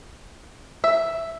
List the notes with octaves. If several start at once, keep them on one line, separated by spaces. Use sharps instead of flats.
E5